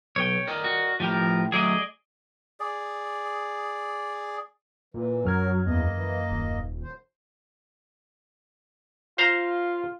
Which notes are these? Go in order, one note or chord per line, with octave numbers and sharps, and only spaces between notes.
B1 C#5 G5
A#4 D5 D#5
F#4
A2 F3 G4 A#4
F#3 A3 G#4 D5 D#5
G#4 D5
A#2 E3
F#2 F#3 A#4 F6 G#6
E2 A#3 D#5
E3
D#1
F#2 C5
F4 C5 F5 A#5